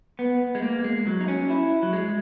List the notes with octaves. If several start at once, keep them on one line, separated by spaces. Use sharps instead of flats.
B3
G#3
A#3
G#3
F#3
D#4
C#4
E4
F#3
G#3